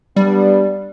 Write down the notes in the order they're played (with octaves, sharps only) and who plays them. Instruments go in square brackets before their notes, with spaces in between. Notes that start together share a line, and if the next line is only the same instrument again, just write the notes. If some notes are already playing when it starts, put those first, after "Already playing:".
[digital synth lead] G3 [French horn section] B3 D4 G4